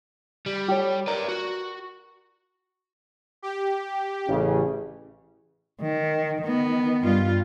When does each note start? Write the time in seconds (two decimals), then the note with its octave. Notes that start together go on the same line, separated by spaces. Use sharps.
0.46 G3
0.68 G4 A4 C#5
1.07 A#4 B4 D5
1.28 F#4
3.42 G4
4.28 A1 C#3
5.81 D#3
6.42 D#3 B3
7.01 G2 G3 F4